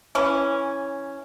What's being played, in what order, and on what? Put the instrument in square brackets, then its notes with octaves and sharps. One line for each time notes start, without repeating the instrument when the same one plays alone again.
[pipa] E3 C#4